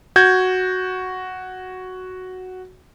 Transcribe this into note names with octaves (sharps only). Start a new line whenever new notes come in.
F#4 G6 G#6